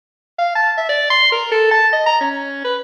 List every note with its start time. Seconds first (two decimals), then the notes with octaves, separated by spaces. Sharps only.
0.39 F5
0.56 A5
0.78 E5
0.89 D5
1.10 C6
1.32 A#4
1.52 A4
1.71 A5
1.93 D#5
2.06 A#5
2.21 C#4
2.65 B4